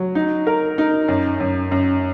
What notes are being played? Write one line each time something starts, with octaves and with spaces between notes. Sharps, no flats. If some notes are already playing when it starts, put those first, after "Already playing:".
Already playing: F#3
D#4
A#4
D#4
F#2
F#2
F#2